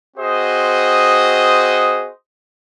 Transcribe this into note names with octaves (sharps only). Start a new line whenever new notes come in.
C4 F#4 G#4 C5 D#5 D#6